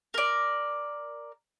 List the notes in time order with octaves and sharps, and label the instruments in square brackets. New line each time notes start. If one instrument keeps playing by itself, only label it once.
[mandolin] A#4 D5